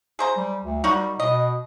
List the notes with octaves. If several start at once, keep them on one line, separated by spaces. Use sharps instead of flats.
G#4 C5 A#5
G3
D2
G3 D#4 F#4 A#4
B2 D#5